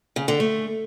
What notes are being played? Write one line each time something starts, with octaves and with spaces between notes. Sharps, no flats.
C#3
D3
A3